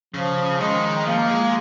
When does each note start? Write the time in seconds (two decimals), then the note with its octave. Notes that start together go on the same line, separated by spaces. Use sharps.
0.14 C#3 F3
0.60 D#3 G#3
1.07 F3 A#3
1.30 G#3